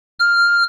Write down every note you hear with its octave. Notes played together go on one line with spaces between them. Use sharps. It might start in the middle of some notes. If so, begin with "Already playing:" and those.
F6